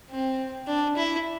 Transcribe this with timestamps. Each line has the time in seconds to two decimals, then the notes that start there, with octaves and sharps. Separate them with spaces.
0.10 C4
0.67 D4
0.96 E4